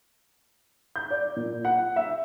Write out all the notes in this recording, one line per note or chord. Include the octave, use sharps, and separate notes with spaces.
G6
D5
A#2
F#5
E5